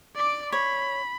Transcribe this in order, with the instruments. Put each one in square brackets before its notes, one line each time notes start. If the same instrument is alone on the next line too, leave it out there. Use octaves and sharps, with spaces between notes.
[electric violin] D5 D6
[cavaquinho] C#5 [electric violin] B5